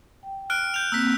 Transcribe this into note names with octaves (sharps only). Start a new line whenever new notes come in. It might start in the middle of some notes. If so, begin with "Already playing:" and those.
G5
F6 F#6 D7
G6 F7
A#3 C4 E6 B6